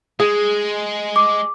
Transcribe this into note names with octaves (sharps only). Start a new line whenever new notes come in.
G#3 G#4
D6